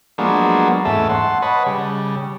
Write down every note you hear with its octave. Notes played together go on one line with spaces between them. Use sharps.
F3 F#3 G#3 A#3 B3 D4
E2 G#2 A3 C#4 E5 A5
F#5 A5 C6
B4 C#5 D#5 F#5 A5 B5
C#3 G3